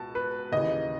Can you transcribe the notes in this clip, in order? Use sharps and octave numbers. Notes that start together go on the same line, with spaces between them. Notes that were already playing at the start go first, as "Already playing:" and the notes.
Already playing: C#2 B2 A5
B4
D#2 C#3 E3 D#5